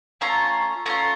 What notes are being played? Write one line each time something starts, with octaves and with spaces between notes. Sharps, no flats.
A3 C#4 F4 A#5
A3 C#4 F4 A#5